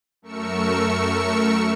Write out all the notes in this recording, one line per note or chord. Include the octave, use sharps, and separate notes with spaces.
F#2 A3 A#4 C#6 E6 C#7